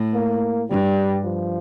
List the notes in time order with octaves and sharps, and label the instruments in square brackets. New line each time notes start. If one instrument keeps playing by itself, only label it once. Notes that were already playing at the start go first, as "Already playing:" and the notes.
Already playing: [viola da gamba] A2
[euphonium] A#3
[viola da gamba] G2 [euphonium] G3
[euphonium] F3